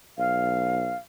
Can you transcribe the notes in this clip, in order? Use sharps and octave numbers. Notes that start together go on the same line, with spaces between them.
B1 F5